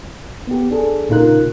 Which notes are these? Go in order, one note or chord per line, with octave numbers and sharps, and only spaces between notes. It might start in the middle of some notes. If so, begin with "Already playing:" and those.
B3 G4
D4 G#4 A4
A#2 C#3 D#4 F4 A#4 F#6